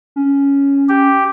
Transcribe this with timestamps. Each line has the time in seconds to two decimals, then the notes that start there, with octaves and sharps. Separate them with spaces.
0.16 C#4
0.89 G4